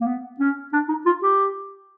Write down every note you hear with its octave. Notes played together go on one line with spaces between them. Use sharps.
A#3
B3
C#4
D4
D#4
F4
G4